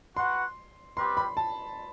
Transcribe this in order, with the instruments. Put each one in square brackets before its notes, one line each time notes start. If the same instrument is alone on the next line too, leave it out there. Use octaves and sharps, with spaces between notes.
[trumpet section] F#4 B4 F#5 [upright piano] C6
[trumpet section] G3 C4 G4 B4 [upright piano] C6
[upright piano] B5
A5